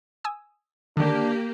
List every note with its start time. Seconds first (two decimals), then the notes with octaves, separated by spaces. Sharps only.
0.24 G#5 D#6 E6
0.97 D3 D#3 A#3 D4 G4